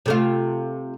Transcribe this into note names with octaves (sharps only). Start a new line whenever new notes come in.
C3 A3 F4